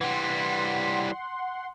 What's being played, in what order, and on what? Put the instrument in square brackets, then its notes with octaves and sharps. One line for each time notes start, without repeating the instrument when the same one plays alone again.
[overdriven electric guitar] E3 G3 [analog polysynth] F#5 C6